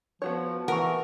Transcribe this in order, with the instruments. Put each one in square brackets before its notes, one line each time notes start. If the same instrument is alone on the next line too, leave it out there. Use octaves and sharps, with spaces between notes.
[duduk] F3 [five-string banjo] B3 F#4 C#5
[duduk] E3 [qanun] A#4 [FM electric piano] F#5 C#6